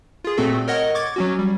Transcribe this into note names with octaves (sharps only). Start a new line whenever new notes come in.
F4 G#4
A#2 A3 C4 F#4 A4
A#4 C#5 D#5 F#5
C#6 D6 G#6 A6
F#3 C#4 F#4
G3